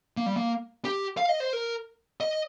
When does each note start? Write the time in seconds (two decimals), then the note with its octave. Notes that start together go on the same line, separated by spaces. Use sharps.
0.17 A#3
0.26 G3
0.37 A#3
0.85 G4
1.17 F5
1.29 D#5
1.40 C5
1.53 A#4
2.20 D#5